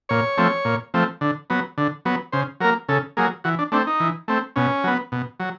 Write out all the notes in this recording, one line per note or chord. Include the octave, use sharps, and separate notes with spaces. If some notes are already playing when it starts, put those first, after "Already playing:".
A#2 C#5
F3 A3 C4
A#2
F3 A3 C4
D3
F#3 B3
D3
F#3 B3
C#3 C5
F#3 A#3 A#4
C#3 A4
F#3 A#3 G#4
E3 F#4
D4
A3 C4 D4
D#4
E3
A3 C4
B2 C#4
F#3 B3
B2
F#3